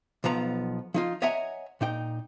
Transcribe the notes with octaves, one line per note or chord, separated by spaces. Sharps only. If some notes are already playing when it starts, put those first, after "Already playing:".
B1 F3 B3 A#5
F3 D#4 F4
C#5 D#5 E5 F#5 G#5 A#5
A#2 D#4 G5